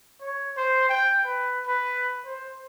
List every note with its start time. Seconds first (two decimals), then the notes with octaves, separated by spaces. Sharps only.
0.21 C#5
0.57 C5
0.89 G5
1.25 B4
1.66 B4
2.26 C5